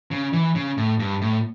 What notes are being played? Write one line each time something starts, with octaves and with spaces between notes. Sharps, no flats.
C#3
E3
C#3
A2
G2
A2